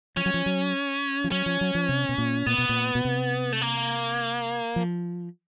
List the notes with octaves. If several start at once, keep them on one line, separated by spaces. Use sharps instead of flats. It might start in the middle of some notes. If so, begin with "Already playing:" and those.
F3 C#4
F#3
F3
F#3
F3
F#3 C#4
F3
F#3
F3
C3
B2
A#2
A#2 B3
B2
A#2
B2
C3
A3
A#3
F3